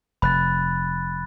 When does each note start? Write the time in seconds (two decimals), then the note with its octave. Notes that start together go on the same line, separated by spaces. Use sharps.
0.22 F1 B5 F#6 A6